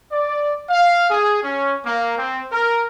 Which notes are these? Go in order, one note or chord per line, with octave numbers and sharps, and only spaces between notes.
D5
F5
G#4
C#4
A#3
C4
A#4